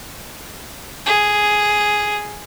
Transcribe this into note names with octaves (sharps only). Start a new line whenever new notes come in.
G#4